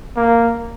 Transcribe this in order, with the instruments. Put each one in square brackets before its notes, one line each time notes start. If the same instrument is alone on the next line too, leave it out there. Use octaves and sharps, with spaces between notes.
[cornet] A#3